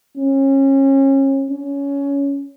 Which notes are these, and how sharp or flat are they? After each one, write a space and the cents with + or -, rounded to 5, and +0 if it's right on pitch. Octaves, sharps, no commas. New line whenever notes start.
C#4 -30
C#4 +15